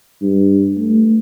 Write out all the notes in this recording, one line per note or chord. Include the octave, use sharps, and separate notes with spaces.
G2
A3